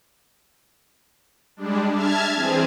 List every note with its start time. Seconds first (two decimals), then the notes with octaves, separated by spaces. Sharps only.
1.56 G3 G#3 D4
1.90 E5 A5 F6 G#6
2.33 E3 C4 G#4